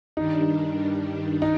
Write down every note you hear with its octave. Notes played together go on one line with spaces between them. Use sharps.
G2 D#3 G3 D4 D#4
D#4